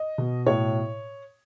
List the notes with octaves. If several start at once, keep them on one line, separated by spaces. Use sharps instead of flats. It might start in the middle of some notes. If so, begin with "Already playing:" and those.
Already playing: D#5
B2
A2 C#5